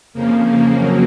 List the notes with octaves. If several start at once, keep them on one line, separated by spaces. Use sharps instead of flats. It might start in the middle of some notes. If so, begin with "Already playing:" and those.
F2 C#3 F3 A#3
A#3
F#3